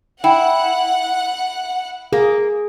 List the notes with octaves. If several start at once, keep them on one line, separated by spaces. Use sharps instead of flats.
E4 F#5 G5
A#3 G#4